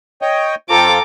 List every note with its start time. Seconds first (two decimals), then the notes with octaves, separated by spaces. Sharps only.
0.22 C#5 D#5 G5
0.70 F2 C4 F4 A4 G5 A#5 D6